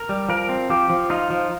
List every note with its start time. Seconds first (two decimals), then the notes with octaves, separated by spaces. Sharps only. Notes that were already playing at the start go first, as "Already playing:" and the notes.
Already playing: A#4
0.09 G3
0.29 F3 A#4
0.49 C4
0.70 F3 G4
0.90 F3
1.10 D#4 F4
1.30 F3